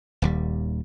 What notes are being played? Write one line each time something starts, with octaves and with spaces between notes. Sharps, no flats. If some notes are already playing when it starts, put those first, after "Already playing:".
D#1 D#2 G3